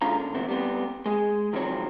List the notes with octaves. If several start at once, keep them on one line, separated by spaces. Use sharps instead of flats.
F2 G#2 D3 C#4 F4 A#5
A#2 D3
A2 E3 B3 C4
G3 B3 C4
G#3 G#4
C#2 D#3 F3 F#3 C4 C#5